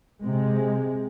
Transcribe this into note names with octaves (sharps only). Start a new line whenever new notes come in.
C3 G#3